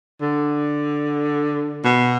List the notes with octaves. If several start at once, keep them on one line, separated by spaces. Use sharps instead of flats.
D3
B2